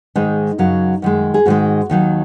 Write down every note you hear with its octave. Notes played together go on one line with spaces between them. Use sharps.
G#2 D#3 G#3 D#4
F#2 C#3 F#3
F#2 D#3 G#3
G#4
G#2 D#3 G#3 F#4
D#2 D#3 F#3